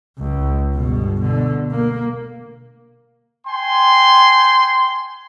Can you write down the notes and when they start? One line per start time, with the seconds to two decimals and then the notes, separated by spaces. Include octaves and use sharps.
0.18 C#2
0.74 G1 B2
1.20 B2 D3
1.71 A#3
3.47 G5 G#5 C6